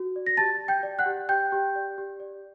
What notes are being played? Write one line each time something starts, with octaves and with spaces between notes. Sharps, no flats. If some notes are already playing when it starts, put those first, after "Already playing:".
Already playing: F#4
D5
A#6
G4 A5 A6
G4
G5 G6
D5
F#5 F#6
G4
G4 G5 G6
G4
D5
G4
D5